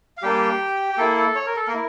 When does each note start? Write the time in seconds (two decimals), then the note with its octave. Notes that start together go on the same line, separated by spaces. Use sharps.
0.17 F5
0.22 G3 A#3 D4 G4 G5
0.93 G4
0.98 A#3 E4 A4
1.17 A4
1.35 C#5
1.46 A#4
1.56 A4
1.67 A#3 A#4
1.74 E4